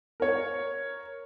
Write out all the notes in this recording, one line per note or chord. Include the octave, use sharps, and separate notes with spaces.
A#4 C#5